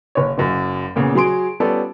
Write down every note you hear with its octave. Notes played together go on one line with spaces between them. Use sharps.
F#1 C#5
F#1 F#2
E2 A#2 C#3
F#3 G#4 C6 D7
G3 B3 C#4 F4 A4 D5